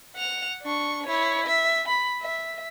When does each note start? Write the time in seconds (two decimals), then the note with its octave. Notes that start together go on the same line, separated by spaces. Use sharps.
0.16 F#5 F7
0.62 D4 C#6
1.06 E4 C#5
1.46 E5
1.88 B5
2.21 E5